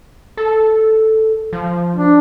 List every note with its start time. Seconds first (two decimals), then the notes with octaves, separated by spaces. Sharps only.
0.37 A4
1.53 F3
1.97 D4